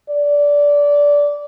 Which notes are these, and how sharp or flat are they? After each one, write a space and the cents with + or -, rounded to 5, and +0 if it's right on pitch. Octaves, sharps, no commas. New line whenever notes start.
D5 -15